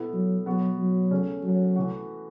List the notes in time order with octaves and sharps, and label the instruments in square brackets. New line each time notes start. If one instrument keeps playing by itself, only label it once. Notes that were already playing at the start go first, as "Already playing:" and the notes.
Already playing: [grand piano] B2 B3 E4 A4
[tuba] F#3
[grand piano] B2 B3 F#4 [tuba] F#3
[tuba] F#3
[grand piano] C#3 A3 C#4
[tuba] F#3
[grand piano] E3 A3 F#4